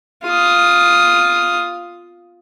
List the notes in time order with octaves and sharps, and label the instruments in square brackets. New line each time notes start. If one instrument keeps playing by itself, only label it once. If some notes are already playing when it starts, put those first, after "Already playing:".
[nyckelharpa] F4 D#6